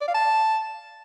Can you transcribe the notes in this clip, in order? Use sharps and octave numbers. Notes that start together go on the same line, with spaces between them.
D5
F5
A5